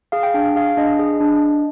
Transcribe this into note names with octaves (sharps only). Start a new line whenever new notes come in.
G#4 F5
G5
D4 G5
G#4 F5
D4 D#5
G#4
D4